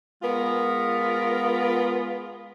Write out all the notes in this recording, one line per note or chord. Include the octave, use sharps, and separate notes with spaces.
G#3 B3 F4 A#4